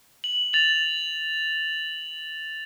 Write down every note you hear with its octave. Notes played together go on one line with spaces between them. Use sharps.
F#7
A6 F7 F#7